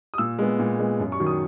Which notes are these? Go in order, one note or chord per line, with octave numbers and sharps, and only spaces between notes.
D#6
A#2 E6
G#3 B3
A#2
G#3 B3
F#2
C#6
D#3 F#3
D#6